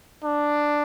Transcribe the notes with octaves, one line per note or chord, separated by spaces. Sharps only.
D4